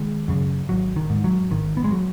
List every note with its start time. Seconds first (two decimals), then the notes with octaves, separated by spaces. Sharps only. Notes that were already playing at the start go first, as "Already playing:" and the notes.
Already playing: D#3 G#3
0.28 F#2 C#3
0.69 G#1 F#3
0.96 D#3
1.10 G#2
1.24 F#3
1.51 G#1 D#3
1.77 B3
1.84 G#3
1.92 F#3